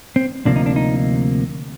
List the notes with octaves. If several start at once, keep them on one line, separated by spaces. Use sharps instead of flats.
C4
D2 C3 F3 A#3 D4
D#4
D4
D#4